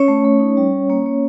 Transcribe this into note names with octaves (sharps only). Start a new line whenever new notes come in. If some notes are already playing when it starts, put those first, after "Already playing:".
Already playing: C#4 C#5
A3
A3
D#4
G3
G3
A#3
A#3